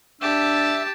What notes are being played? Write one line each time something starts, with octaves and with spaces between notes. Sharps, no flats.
D4 G4 E5 A5 E6 A6